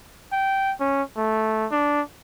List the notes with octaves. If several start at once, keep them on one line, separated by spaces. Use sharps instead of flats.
G5
C#4
A3
D4